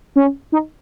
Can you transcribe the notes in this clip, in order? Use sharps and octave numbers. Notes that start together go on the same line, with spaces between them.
C#4
D#4